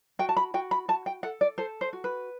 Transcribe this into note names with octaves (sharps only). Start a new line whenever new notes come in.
F#4 G5
A5
B5
F#4 G5
B5
F#4 A5
G5
A4 F#5
D5
A4 C5
C5
F#4
B4